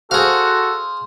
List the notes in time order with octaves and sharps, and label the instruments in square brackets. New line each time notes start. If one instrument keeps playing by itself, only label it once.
[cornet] F#4 [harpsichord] G#4 F5 [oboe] A4 [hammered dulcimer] C5